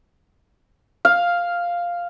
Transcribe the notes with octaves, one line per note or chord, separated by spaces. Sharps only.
F5